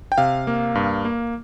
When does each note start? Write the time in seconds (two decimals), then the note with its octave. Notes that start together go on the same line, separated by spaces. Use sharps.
0.12 G5
0.18 C3 F5
0.47 A#3
0.75 G2
1.05 A#3